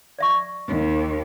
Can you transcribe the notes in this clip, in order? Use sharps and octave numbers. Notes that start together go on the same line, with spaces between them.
D5 E5 C#6
D#2